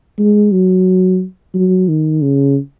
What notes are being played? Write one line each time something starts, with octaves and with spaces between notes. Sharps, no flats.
G#3
F#3
F#3
D#3
C#3